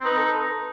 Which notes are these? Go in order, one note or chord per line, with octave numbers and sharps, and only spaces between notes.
C4
D#4 B4
A4